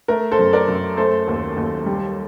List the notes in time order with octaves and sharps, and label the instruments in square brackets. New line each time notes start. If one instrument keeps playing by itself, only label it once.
[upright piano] A3 A#4
A4 C5
F#2
A#4 D5
F#2
A3 A4 C5
D#2
D#2
G3